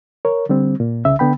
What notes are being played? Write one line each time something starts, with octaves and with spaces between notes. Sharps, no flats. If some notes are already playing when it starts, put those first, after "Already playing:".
A#4 C#5
D3 G3 C4
A#2
C2 C#3 E5
D3 B3 G5 B5